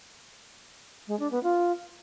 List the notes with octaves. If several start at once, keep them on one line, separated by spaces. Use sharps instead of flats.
G#3
D4
B3
F4